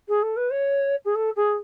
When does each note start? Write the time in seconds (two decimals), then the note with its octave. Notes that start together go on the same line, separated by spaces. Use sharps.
0.08 G#4
0.22 A4
0.36 B4
0.50 C#5
1.05 G#4
1.14 A4
1.36 G#4